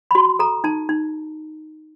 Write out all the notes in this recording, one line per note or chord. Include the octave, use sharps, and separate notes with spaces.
B5
F#4 C6
A4 A#5
D#4 A5
D#4